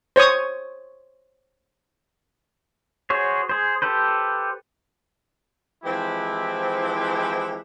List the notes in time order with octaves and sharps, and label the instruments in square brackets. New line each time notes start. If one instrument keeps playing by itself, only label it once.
[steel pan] C5 C#5 C#6 D#6
[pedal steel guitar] F#4 G#4 C5 C#5
G#4 C5
G4 A4 B4 C5
[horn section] E3 F3 G#3 C4 E4 G4